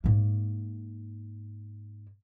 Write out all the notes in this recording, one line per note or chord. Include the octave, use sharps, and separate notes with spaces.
G#2 A#3